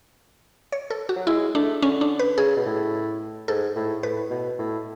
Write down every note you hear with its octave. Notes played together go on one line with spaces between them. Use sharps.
C#5
A4
F#4
F#3
G#3 E4
A3 D4
D3 C#4
D4
B4
C#3 G#4
B2
A2
G#2 A4
A2
A2 B4
B2
A2